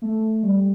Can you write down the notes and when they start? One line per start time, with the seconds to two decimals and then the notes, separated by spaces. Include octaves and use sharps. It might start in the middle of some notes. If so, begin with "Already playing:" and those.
0.02 A3
0.43 G3